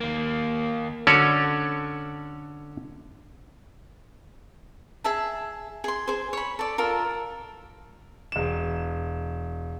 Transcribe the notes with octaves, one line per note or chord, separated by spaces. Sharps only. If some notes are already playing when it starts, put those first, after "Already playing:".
D#2 A#3
D3 C#4 F#4 A4 C#5 D5
G#4 E5 A5
G#4 C6
G#4 C5
C#5 B5
A4 D5
F4 A4 A#4
E1 E7